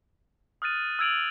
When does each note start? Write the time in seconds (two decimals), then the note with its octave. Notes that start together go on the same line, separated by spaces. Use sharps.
0.62 D#6 F6 F#6 A6 D#7
0.99 E6 F6 G#6 D7 F7 F#7